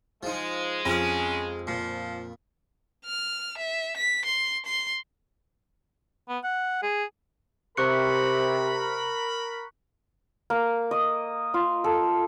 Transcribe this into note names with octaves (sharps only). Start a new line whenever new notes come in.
F3 G#3 D#4
F2 C#4 G#4 F5
A#2 F3
F6
E5
B6
C6
C6
B3
F#5
G#4
C3 A#4 B5 C#6 F#6 C#7
A#3
D#5
F4
A4